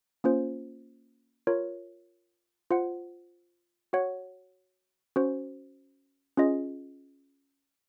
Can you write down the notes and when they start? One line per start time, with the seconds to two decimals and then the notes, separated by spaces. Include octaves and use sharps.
0.24 A#3 C#4 F4 C5
1.47 F4 A#4 C#5
2.71 F4 C5 F#5
3.93 F#4 C#5 F#5
5.16 C#4 F#4 C5
6.37 C#4 F4 G#4 D#5